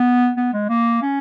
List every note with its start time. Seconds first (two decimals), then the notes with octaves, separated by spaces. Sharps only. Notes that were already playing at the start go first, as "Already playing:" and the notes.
Already playing: B3
0.37 B3
0.53 G#3
0.69 A#3
1.02 C#4